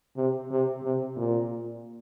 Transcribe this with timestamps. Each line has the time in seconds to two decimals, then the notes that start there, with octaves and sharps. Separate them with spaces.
0.17 C3
0.51 C3
0.83 C3
1.16 A#2